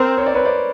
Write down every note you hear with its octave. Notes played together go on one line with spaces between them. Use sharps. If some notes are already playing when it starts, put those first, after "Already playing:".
Already playing: C4 A#4 C5
C#5
D5
B4 C#5
C5 D5